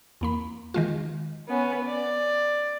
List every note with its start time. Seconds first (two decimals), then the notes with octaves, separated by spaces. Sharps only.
0.21 E2 A#3 B5
0.74 D#3 G#3 F4
1.48 B3 C#4
1.85 D5